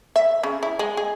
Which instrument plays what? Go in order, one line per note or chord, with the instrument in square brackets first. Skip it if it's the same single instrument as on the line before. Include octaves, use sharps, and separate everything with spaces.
[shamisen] E5
C#3
E4
G#3
G#4